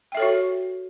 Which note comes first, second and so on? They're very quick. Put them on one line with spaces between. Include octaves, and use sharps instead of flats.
G5 E5 A4 C#5 F#4